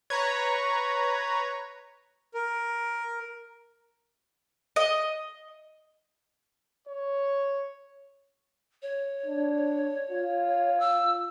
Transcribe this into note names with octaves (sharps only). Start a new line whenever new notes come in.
B4 C#5 A#5
A#4
D#5
C#5
C#5
D4
F4
E6